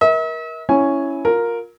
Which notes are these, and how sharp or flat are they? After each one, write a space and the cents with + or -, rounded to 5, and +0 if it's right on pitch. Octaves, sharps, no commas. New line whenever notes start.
A#4 +30 E5 -45
C#4 +0 E4 +0 G#5 +0
F4 +25 A#4 +0